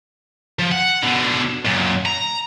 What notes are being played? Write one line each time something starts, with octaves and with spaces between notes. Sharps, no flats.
F3
F#5
B2 D3
F#2 A#2
A#5